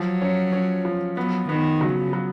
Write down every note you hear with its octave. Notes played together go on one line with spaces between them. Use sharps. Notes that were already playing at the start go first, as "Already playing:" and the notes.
Already playing: F3 F#3
C#4
C#4
F3
F#3 B3
D#3 B3
C#3 F#3
F#3